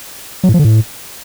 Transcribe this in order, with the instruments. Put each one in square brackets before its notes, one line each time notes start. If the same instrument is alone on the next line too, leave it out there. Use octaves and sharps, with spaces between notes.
[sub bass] F#3
A2
F3
D3
A2